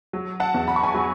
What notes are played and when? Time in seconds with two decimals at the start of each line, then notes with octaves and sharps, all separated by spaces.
0.13 F#3
0.40 F#5 A5
0.54 E2
0.68 B5
0.76 C#6
0.84 G#5 B5
0.94 F#3